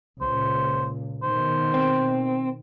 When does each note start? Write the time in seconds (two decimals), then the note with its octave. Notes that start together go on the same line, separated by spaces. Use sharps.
0.21 C#2 A#2 C5
1.23 B2 D#3 C5
1.74 C4